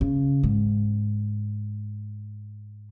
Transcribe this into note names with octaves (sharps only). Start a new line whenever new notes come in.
C#3
G#2